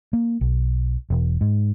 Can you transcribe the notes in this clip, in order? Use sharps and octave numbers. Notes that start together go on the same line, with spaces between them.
A#3
B1
E1
G#2